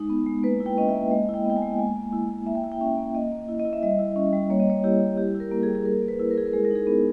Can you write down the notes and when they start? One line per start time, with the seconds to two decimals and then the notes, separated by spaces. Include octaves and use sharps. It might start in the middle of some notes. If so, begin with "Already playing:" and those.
Already playing: G#3 D#4
0.10 B3
0.26 G#3
0.43 A#3 B4
0.60 E4
0.66 G5
0.78 C#4 D#5
0.89 E5
0.94 A#3
1.12 G#3 D#5
1.29 E4
1.34 G5
1.45 B3 G5
1.57 G#5
1.62 G#3
1.79 A#3 G#5
1.96 A#3
2.12 E4
2.30 E4
2.46 A#3 E5
2.55 G5
2.63 E4 E5
2.72 G5
2.81 C#4 E5
2.97 A#3
3.14 A#3 D#5
3.32 A#3
3.49 E4
3.59 D#5
3.65 E4
3.73 E5
3.83 G3 D#5
3.99 E4
4.16 C#4
4.33 G3
4.50 A#3 C#5
4.60 D#5
4.67 A#3 C#5
4.84 E4 G4
5.01 E4
5.17 G3 G4
5.35 E4
5.40 A#4
5.51 A#3
5.63 G#4
5.69 G3
5.75 G#4
5.85 A#3 A#4
6.02 A#3
6.08 B4
6.20 E4
6.31 A#4
6.37 E4 G#4
6.46 A#4
6.53 G#3 G#4
6.65 A#4
6.71 D#4 G#4
6.87 B3